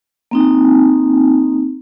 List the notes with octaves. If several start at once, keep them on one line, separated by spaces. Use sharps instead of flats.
A#3 C4 D#4